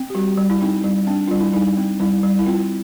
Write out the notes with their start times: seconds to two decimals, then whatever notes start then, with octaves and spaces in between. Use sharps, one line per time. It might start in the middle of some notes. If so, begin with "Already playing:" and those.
Already playing: C4
0.10 G4
0.15 G3 F#4
0.38 G3
0.50 E4
0.61 C4 D#4
0.84 G3
1.07 C4 D4
1.28 G3 F4
1.40 E4
1.53 G3 D#4
1.77 C4
2.00 G3 E4
2.23 G3
2.39 E4
2.46 C4 F4